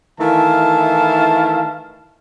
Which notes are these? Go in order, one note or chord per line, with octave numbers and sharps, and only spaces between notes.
D#3 E3 A3 E4 F5 A5